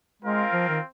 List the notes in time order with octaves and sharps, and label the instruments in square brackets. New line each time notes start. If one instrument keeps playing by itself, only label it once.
[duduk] G#3 [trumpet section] C4 F4 A#4 F5
[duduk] F3
D#3